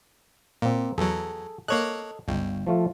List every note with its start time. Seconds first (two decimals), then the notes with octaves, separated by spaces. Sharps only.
0.62 A#2 A#3 C4
0.98 E2 F#3 G#4 A4
1.68 A#3 A4 C#5 D#5 F#6
2.28 G1 C#2 G5
2.67 F3 A3 F4